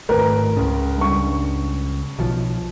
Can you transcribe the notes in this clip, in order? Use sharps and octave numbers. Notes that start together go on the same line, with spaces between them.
G#1 A2 A#4 B4
C#2 C#3
G2 C#6
B1 F3